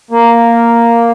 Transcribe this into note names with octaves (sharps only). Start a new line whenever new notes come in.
A#3